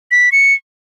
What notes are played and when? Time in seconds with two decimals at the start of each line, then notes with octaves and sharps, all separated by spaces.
0.11 B6
0.32 C#7